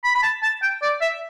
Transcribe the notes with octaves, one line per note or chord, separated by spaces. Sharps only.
B5
B5
A5
A5
G5
D5
E5